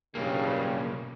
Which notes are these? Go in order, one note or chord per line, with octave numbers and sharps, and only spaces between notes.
F#1 B1 G2 C#3 A#3